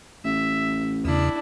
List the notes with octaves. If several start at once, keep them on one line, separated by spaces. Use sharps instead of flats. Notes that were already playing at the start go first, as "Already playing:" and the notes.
A1 E5
E2 C#3 D4 E4